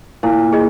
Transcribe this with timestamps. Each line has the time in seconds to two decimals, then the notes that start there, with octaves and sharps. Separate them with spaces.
0.23 A#2 E4
0.53 G#4 D#5